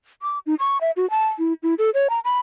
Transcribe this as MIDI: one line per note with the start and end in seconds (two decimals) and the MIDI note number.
0.22 0.39 86
0.46 0.55 63
0.60 0.78 85
0.81 0.91 76
0.97 1.09 66
1.10 1.27 81
1.39 1.53 64
1.63 1.74 64
1.78 1.90 69
1.94 2.08 73
2.10 2.20 82
2.25 2.39 83